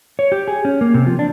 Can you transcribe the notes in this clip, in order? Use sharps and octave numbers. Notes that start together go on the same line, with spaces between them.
C#5
G4
G#4
C#4
A#3
C3
F3
D4